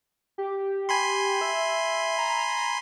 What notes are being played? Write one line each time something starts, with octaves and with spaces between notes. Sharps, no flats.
G4
G#5 B5 C6
E5
A#5